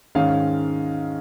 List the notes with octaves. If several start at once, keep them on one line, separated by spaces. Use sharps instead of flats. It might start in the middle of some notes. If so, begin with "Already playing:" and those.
G#2 D#3 G#3 C#4 F5